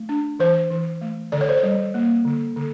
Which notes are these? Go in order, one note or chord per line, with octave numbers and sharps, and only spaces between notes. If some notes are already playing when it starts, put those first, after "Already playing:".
Already playing: A3
D4
E3 C5
E3
A3
D3 D5
C#5
C5
C#5
G3
A#3
D3
D3